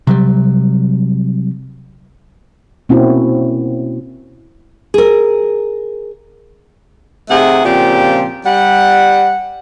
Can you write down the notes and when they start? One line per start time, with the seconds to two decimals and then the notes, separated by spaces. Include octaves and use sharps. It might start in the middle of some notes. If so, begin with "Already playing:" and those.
0.07 C3 F#3 G3
2.89 B2 A#3 C4 C#4 E4 F#4
4.94 G#4 A#4
7.29 C3 A3 D#4 G#4 F#5
7.65 A#2 C#3 F3 C4 G4
8.46 G3 F#5